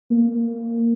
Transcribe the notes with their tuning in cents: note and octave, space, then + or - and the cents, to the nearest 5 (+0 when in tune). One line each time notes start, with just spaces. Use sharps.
A#3 -15